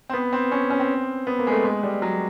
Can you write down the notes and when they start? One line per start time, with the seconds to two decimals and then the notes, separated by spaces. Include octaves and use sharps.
0.10 C4
0.13 B3
0.33 C4
0.52 C#4
0.70 C#4
0.80 C4
1.27 B3
1.39 A#3
1.47 G#3
1.52 A3
1.64 G#3
1.83 G3
2.02 F#3